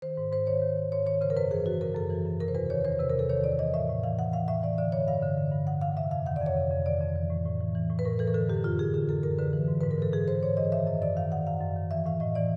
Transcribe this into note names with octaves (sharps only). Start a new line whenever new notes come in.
D#3 C5
G#2
G#2 C5
D#3 C#5
D#3
G#2
G#2 C#5
D#3 C#5
C#3 C5
A#4
F#2 B4
E3 G#4
F#2 F#4
C#3 A#4
F#2 A4
E3
F#2
C3 A#4
C5
E2 B4
D#3 C#5
E2 C5
C3 B4
A#4
E2
A4
D#3 C#5
E2 D5
E3 D#5
A2 E5
A2
E3 F5
E3 F#5
A2 F5
A2 E5
E3 D5
D3 D5
G2 C#5
G2 F5
D3
D3
G2
G2 F#5
D3 F5
C3 E5
F2 F5
D#3 F#5
D5
F2
C#5
C3
F2
D#3 D5
F2
E3
A2
A2
E3
E3
A2
B4
A2 A#4
E3 A4
A#4
D3 A4
F#2 G4
F#2 F4
D3 G#4
D3 G#4
F#2 A4
F#2 A#4
D3 B4
E3
G#2
G#2 B4
A#4
E3 A4
E3 G#4
G#2 C5
G#2 C#5
E3 D#5
D#3 E5
F#2 D#5
F#2 D5
D#3 F5
D#3 F#5
F#2 F5
F#2
D#3
E3 E5
A2 F5
A2 D#5
E3 D5